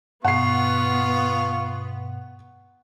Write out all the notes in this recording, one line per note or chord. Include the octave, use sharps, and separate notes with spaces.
G2 B2 B3 F4 F5 F#5 C#6 C7